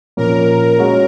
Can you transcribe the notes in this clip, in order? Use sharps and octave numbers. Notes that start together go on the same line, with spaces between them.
A#2 F3 A#3 C#4 A#4
G#3 C#4 F#4 C#5